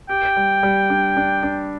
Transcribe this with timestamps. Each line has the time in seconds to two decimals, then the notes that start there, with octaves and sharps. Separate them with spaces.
0.09 G4 G5
0.36 G3
0.63 G3
0.90 D4
1.17 D4
1.43 D4